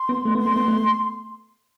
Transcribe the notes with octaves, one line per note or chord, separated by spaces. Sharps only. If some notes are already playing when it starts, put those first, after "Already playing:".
Already playing: C6
B3
A3
B3 C6
A3
B3
A3